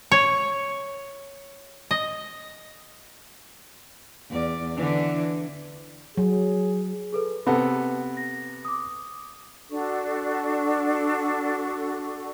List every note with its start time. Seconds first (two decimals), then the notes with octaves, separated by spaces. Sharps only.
0.12 C#5
1.91 D#5
4.30 E2 D5
4.74 D3 E3 D4
6.17 F#3 G#4
7.13 G#4 A4 B4
7.46 C3 B3 A4 B5
8.17 A#6
8.65 D6 D#6
9.70 D4 F#4 A4 C#6